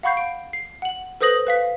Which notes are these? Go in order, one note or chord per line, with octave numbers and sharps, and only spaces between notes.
F5 F#5 B5 C#6 G6 C7
D7
C7
F#5 F#7
A4 B4 C5 D#6 A#6 F#7
B4 F5 B6